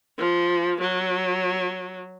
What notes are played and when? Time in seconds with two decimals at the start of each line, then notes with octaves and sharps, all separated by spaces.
0.19 F3
0.81 F#3